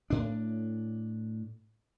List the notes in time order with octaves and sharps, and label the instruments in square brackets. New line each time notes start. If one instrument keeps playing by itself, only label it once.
[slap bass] A2 D4